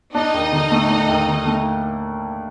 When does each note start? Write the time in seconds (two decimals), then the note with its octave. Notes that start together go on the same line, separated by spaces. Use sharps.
0.15 D4 D#4 D#5
0.34 D#2
0.52 D3
0.71 A3
0.90 D4
1.08 D#2
1.28 D3
1.46 A3